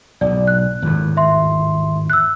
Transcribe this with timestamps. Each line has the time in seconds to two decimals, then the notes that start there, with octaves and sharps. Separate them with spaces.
0.21 B1 G#2 D5
0.47 F#6
0.82 G#1 E2 A2
1.17 E5 C6
2.10 E6 F#6